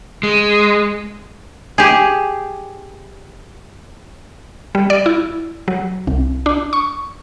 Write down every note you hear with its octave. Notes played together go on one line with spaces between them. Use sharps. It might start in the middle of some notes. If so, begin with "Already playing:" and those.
G#3
G4 G#4
G3
D5
E4
F#3
C2
D4
C#6